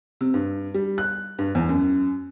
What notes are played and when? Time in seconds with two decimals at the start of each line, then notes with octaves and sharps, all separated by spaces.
0.21 C3
0.34 G2
0.74 G3
0.98 F#6
1.39 G2
1.55 E2
1.69 F#2